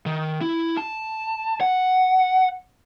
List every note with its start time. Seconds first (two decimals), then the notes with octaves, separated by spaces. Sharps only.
0.06 D#3
0.41 E4
0.77 A5
1.61 F#5